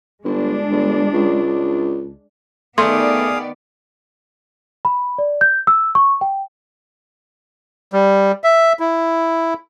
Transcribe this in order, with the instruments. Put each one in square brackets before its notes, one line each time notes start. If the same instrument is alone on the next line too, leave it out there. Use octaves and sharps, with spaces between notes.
[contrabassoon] G1 [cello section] G#3 D4
[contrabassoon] G1
C#2
[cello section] D#3 B3 D5 [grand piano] A3 [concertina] G#4 F5 D#6 [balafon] C6
[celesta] B5
D5
G6
E6
C#6
G5
[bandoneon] G3
E5
E4